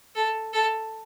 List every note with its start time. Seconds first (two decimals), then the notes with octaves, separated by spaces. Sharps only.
0.15 A4
0.53 A4